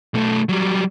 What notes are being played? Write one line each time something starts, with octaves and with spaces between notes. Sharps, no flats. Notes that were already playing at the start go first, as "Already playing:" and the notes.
B1 A3
F#3 G3